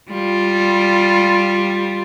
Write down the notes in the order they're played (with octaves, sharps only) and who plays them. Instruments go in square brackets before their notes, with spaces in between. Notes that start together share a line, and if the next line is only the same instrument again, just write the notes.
[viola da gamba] G3 F4